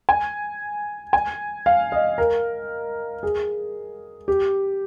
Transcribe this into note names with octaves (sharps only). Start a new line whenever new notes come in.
G#5
G#5
F5
D#5
A#4
G#4
G4